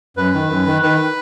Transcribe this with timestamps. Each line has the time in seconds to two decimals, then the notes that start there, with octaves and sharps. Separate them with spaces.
0.17 F#2 B4
0.34 D#3
0.49 F#2
0.66 D#3
0.82 D#3 B4